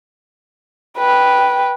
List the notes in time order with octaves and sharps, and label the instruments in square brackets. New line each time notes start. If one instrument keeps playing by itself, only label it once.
[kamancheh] B4 G5